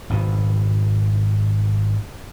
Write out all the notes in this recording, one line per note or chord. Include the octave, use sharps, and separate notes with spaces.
G#1 B2